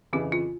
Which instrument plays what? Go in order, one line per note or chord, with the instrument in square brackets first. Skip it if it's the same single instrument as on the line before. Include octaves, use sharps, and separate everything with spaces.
[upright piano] F2 C#3 E3 [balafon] G4
[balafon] F4